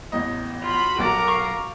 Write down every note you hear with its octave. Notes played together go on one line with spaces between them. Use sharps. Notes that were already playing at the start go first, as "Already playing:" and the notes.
A1 E2 D#5
F4 F#4 B5
B1 F#4 A#4 A#5 D6 A6
F5 C#6